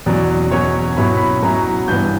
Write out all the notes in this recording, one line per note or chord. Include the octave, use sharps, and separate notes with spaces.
E2 B2 F#3 C#4 D5
E2 B2 F#3 C#4 C#5
B2 F#3 C#4 E4 B5
C#6
B5
B2 F#3 C#4 E4 A#5
G2 E3 B3 G6